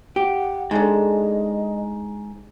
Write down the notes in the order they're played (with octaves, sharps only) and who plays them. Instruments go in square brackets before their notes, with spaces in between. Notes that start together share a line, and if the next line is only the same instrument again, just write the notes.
[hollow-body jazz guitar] G4 [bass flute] F#5
[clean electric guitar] G#2 [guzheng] G#3 A3 D4 [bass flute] D#5